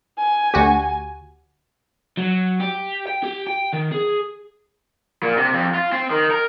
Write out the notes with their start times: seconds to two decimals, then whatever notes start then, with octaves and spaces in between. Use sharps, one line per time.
0.18 G#5
0.54 D2 F#4 G4
2.18 F#3
2.60 G4
3.07 G5
3.24 G4
3.47 G5
3.73 D#3
3.91 G#4
5.23 A#2
5.37 C3
5.54 F2
5.75 F4
5.92 C4
6.10 D#3
6.31 A#4